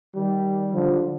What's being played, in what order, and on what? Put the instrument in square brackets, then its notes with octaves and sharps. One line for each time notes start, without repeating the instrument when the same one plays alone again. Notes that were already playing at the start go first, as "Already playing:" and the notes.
[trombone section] D#3 G3
D3 F3